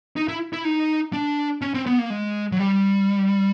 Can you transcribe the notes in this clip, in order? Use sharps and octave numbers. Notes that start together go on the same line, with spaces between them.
D#4
E4
E4
D#4
D4
C#4
C4
B3
A#3
G#3
F#3
G3